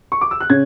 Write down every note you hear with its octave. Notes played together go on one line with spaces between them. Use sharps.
C#6
D6
E6
F#6
C#3 C#4 G#6